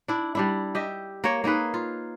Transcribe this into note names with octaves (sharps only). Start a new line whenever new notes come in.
D4 E4
G3 D4 E4
G4 D#5 E5
A#3 C#5
A#3 D#4 G#4 B4
F4